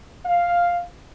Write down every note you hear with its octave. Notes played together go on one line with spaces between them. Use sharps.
F5